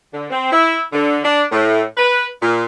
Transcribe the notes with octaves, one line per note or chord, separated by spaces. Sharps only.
D3
C4
E4
D3
D4
A2
B4
A#2